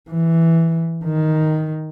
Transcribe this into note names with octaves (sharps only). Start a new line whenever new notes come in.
E3
D#3